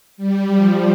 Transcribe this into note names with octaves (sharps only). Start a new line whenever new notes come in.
G3
F3